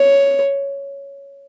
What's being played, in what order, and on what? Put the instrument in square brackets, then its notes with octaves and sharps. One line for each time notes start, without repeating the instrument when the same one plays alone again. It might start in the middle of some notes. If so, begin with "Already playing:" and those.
Already playing: [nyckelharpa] C#5